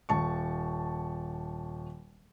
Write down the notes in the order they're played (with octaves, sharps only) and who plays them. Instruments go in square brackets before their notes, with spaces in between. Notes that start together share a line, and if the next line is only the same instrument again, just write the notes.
[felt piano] D#1 A5 C#6